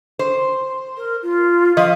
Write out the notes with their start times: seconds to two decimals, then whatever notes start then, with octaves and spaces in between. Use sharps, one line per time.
0.19 C5
0.97 A#4
1.23 F4
1.77 F3 D#5 F5